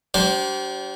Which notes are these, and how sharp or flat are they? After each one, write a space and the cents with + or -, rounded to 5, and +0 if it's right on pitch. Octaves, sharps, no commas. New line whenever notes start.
G3 -35 D4 -35 C5 +5